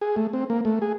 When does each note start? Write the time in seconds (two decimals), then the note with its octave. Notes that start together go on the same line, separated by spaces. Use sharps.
0.01 G#4
0.16 A3
0.33 C4
0.50 A#3
0.65 A3
0.82 G#4